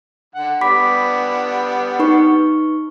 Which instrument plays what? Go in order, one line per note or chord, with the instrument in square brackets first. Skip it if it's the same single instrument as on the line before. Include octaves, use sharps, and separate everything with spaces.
[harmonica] D3 F#5
[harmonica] G3 B3 D4 [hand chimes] B5 D6 B6
[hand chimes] D#4 B4 C#6